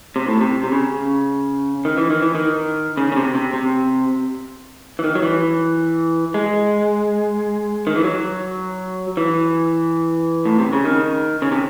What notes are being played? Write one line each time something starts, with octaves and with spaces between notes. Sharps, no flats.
C3
A2
C3
C3
C#3
D#3
E3
D#3
E3
D#3
C#3
C#3
C3
C3
C3
E3
D#3
F#3
E3
G#3
D#3
E3
F#3
E3
A2
C3
C#3
D#3
C#3
C3